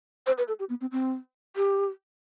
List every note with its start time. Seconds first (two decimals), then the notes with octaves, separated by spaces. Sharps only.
0.27 C5
0.38 B4
0.48 A4
0.60 G4
0.69 B3
0.81 C4
0.92 C4
1.56 G4